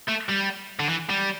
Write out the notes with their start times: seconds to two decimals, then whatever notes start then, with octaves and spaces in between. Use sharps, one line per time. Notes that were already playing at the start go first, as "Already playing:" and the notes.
0.09 A3
0.29 G3
0.80 D3
0.89 E3
1.10 G3